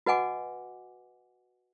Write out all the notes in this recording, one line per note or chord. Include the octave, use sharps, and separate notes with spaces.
F#4 B4 D#5 F#5 G#5 D6